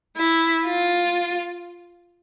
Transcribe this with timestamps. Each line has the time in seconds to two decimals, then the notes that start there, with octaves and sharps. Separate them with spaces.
0.17 E4
0.65 F4